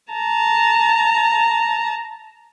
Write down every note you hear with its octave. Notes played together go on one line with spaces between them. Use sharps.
A5 A#5